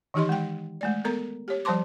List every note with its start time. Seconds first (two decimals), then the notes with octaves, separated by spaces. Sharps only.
0.14 D#3 E3 D#4 G4 D#5 C6
0.29 G#3 G5
0.81 G#3 A3 D5
1.05 B3 A4 A#4 A#5
1.48 G4 C#5
1.65 F3 G3 C5 A5 C6 D6